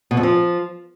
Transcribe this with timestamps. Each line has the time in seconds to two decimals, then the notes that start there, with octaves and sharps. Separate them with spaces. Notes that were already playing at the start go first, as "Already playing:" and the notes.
0.11 B2
0.17 F2
0.23 F3